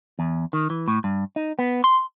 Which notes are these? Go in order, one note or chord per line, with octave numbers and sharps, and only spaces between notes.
E2
D#3
E3
A2
G2
D#4
B3
C6